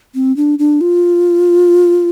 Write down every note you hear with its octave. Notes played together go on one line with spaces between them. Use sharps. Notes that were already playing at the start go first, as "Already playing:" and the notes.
C4
D4
D4
F4